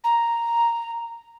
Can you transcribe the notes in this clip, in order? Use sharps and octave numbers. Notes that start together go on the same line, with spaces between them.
A#5